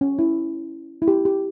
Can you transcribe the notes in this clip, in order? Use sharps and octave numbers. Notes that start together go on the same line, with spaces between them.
C#4
E4
E4
G4
G4